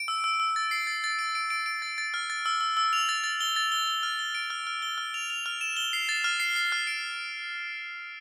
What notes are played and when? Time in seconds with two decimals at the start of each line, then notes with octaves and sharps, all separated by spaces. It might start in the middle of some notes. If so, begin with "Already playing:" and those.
Already playing: D7
0.08 E6
0.24 E6
0.40 E6
0.56 A6
0.71 C7
0.87 A6
1.04 A6
1.19 D7
1.35 D7
1.50 D7
1.66 D7
1.82 A6
1.98 A6
2.14 F6
2.30 A6
2.46 E6
2.61 E6
2.77 E6
2.93 F7
3.09 A6
3.24 A6
3.41 G7
3.56 A6
3.72 G7
3.87 G7
4.03 F6
4.19 G7
4.35 D7
4.50 F6
4.67 F6
4.82 G7
4.98 F6
5.14 F7
5.30 F7
5.46 F6
5.61 E7
5.77 G7
5.93 C7
6.09 A6
6.24 F6
6.40 C7
6.56 C7
6.72 F6
6.87 D7